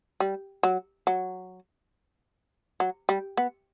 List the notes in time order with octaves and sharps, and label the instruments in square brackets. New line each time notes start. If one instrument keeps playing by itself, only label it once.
[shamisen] G3
F#3
F#3
F#3
G3
B3